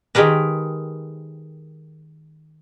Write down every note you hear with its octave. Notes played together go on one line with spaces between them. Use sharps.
D#3 G#3 G4 A#4 B4